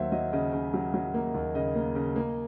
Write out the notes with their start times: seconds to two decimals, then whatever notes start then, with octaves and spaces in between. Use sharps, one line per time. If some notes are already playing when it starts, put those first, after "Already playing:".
Already playing: D#2 F#3 C5 E5
0.12 F#3 D#5
0.33 C#3 D#5
0.53 C#3
0.73 F#3
0.94 F#3
1.14 A#3
1.34 D#2
1.55 C#3 D#5
1.75 A#3
1.95 C#3
2.16 A#3